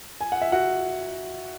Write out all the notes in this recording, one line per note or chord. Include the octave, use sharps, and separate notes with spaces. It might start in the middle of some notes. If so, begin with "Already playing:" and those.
G#5
F#5
E5
F#4 F#5